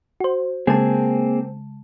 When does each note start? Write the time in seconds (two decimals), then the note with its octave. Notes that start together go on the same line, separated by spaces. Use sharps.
0.20 F#4 C5
0.67 C#3 G#3 A#3 C4 G#4 A5